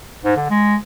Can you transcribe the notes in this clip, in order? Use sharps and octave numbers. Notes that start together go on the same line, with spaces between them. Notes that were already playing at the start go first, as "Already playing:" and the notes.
G#2
D3
G#3